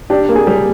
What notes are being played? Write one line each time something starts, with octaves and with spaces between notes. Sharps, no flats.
D4 G4
A#3
G#4
G3